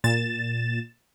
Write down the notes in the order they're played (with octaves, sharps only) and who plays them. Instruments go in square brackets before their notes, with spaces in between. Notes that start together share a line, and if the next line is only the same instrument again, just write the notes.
[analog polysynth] A#2 A6 E7